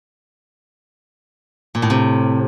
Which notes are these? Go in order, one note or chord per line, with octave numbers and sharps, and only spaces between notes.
A#2
A2
C3